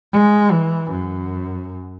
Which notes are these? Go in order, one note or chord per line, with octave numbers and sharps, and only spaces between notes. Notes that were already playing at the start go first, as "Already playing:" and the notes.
G#3
E3
F#2